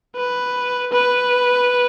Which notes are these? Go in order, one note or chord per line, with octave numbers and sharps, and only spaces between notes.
B4
B4